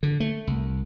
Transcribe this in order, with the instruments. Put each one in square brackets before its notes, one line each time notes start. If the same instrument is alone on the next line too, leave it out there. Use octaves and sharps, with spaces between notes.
[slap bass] D3
A3
C2